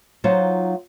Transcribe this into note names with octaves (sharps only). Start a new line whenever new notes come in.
F#3 D#4 F4 C5 F5 F#5